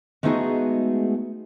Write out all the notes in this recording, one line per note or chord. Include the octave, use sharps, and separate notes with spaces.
G#3 A3 B3 D#4 F#4 G#4